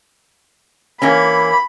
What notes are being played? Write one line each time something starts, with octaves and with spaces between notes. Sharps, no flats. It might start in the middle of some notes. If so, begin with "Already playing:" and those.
E3 A#3 C#4 B5